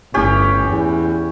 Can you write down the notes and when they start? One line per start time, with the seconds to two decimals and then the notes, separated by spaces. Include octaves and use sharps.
0.14 G1 D2 A2 C#4 G4
0.64 E2